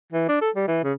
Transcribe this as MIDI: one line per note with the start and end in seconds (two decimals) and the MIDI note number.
0.13 0.26 52
0.29 0.38 62
0.41 0.50 69
0.56 0.65 55
0.68 0.84 52
0.84 0.93 49